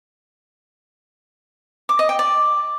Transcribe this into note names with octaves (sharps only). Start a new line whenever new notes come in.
D6
D#5
G5
D5